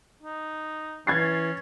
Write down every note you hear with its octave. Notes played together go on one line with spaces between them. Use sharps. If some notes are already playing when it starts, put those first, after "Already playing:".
D#4
E3 C#4 G#6 A6 C7